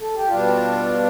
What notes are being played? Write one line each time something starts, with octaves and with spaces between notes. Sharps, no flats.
A4
G4
B2 G3 D4 F4